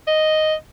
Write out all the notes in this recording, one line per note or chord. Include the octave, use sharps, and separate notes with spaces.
D#5